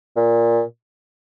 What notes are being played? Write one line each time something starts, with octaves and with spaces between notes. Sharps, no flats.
A#2